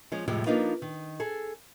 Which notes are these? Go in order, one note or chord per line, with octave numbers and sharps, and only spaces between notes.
F3 G#3 C#4
F2 A2 C3 F3 G3 G#3
F3 A#3 D4 D#4 F4 B4
D#3
G#4 A4